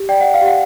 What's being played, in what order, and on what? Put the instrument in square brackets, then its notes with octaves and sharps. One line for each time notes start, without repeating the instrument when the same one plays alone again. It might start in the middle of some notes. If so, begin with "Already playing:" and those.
Already playing: [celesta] G4
D5 G5
D5 F#5
F5
G4
F#5